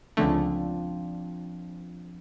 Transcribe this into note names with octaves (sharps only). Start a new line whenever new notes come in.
C#2 D3 F3 A3 C4 D4